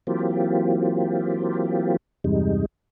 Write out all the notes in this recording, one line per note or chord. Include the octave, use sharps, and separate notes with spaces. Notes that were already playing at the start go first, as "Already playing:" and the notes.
E3 F#3 A#3 C4 F4 G4
E2 G2 C3 G3 G#3 D#4